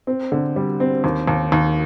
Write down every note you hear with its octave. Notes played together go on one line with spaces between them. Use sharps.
C4
D3
G3
C4
D#2
D#2
D#2